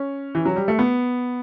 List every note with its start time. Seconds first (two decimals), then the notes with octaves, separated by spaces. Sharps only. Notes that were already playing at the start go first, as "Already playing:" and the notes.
Already playing: C#4
0.35 E3
0.45 F#3
0.56 G3
0.68 A3
0.79 B3